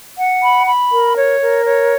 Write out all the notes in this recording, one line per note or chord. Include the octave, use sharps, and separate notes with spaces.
F#5
B5
B5
A#4
C#5
A#4
C#5